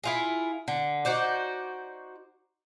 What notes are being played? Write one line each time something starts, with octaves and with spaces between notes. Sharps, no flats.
E4 F4 G#4
D3
D#4 F#4 C5 D5